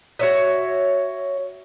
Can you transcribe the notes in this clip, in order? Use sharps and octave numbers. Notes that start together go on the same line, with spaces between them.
F#4 C#5 E5